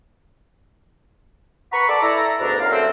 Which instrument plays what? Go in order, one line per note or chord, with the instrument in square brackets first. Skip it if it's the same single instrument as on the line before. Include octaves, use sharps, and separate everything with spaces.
[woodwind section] B4 F#5 A#5 B5 C#6
A4 D5
E4 A4 A#5
D2 G#2 B2 D4 A#5
F#2 F5
D3 F#3 A3 C4